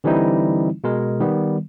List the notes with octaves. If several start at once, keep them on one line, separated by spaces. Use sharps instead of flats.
D3 E3 G3 C4 D#4 E4
B2 G#3 A#4
D#3 G3 B3